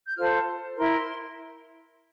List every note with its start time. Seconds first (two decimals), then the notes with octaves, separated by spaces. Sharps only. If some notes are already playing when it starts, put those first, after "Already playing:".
0.05 G6
0.16 F4 A4 C5 F6
0.76 E4 A#4 C6